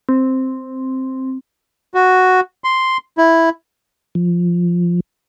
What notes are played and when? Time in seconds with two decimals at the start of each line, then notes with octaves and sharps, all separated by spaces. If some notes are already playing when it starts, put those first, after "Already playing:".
0.09 C4
1.94 F#4
2.64 C6
3.18 E4
4.15 F3